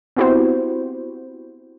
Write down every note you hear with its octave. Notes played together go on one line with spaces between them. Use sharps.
B3 C4 E4 F#4 G4 C5